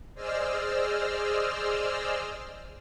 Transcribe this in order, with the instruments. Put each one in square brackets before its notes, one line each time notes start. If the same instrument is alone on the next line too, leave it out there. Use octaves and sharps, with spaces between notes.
[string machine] G#4 C5 D5 D#5 E6 F6